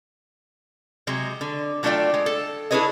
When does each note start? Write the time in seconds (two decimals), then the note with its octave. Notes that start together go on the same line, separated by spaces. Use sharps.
1.07 C3 F#3 G#3
1.41 D3
1.83 F#3 A3 D4 F4 D5 G5
2.14 G#3
2.26 A4
2.71 D4 E4 G#4 B4 C#5 D#5